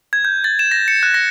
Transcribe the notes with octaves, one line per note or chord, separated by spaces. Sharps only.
G#6
G6
A6
E7
A#6
C#7
F#6
A#6